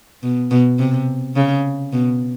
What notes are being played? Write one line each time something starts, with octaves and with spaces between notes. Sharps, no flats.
B2
B2
C3
C#3
B2